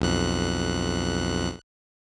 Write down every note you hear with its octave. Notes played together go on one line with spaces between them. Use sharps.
B1 F2 F#6